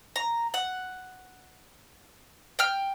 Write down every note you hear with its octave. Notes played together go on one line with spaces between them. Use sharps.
A#5
F#5
G5 F6